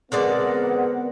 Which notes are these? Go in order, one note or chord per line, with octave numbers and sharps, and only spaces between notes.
D3 G#3 B3 C4 A#4 B4 D5 F#5